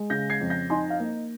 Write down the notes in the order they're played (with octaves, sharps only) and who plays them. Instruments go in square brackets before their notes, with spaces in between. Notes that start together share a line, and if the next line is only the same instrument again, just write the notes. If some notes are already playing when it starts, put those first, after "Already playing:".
Already playing: [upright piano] G#3
C#3 G6 A#6
G#6 C7
F2
G6 A#6
D#4 G#5 C6
F5
A#3